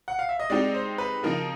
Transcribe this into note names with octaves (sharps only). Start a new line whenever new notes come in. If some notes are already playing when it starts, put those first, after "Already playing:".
F#5
F5
E5
D#5
G#3 C4 D#4 G4 D5
C5
B4
C#3 F3 A#3 D#4 A#4